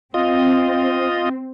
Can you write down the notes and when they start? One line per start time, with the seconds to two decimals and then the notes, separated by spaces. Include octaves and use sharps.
0.14 C4 F4 D#5